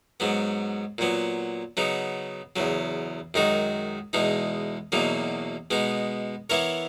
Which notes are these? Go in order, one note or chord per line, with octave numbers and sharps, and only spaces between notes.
G#2 F#3 B3
A#2 F#3 B3
C#3 F#3 B3 D#4
E2 C#3 F#3
F#2 D#3 G#3 D#4 F#4
E2 B2 G#3 D#4
E2 B2 F#3 A#3 D#4
B2 G#3 B3 D#4
E3 B3 E4 A#4 C#5